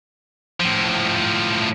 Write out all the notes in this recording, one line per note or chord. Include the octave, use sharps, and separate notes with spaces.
A2 F3